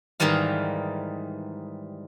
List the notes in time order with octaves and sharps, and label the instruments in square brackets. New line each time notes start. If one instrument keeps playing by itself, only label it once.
[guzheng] G#2 D#3 E3 G3 F5